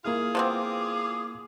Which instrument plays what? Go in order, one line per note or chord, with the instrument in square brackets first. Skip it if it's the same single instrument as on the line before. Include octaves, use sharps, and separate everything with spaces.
[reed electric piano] A#3 E4 F6 [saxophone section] F4 G#4
[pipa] F3 B3 C4 [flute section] D6